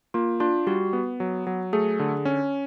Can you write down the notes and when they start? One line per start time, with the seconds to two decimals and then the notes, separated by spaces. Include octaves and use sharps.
0.14 A#3 F4
0.40 D4 F4
0.67 G3 F#4
0.93 B3
1.20 F#3
1.47 F#3
1.73 A3 G#4
1.99 D3
2.25 C#4